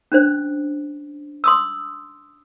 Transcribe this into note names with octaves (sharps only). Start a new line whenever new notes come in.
C#4 D4 C5
C6 D#6 E6